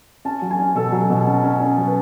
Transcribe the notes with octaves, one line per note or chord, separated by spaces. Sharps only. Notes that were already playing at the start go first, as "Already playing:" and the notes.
C#4 A5
F#3
G#5
C#4
B2 A4
F#3
B2
C#4
C#4
C#4
F#3
B4